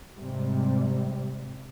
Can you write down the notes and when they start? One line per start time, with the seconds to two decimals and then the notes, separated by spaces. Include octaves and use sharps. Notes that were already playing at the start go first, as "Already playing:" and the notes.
0.16 G#2 C3 G3